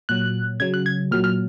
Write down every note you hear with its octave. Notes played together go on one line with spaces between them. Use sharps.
A#2 F#3 F#6
C#3 F#3 G#6
F#6
G#6
A#2 F#3 F6
F6